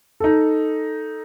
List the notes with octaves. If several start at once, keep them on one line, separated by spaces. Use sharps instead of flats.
D#4 A4